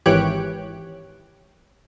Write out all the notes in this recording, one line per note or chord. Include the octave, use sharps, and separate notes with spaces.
G#1 E3 G4 C#5 F#6 D7